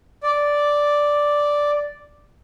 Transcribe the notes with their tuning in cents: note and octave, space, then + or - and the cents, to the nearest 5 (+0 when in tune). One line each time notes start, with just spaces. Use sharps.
D5 -5